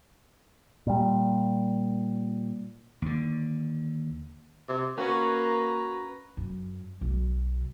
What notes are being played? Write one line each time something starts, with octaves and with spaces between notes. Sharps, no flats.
A#2 G3
D#2 D3
C3
A#3 C#4 F#4 B4 A#5
F#2
B1 B2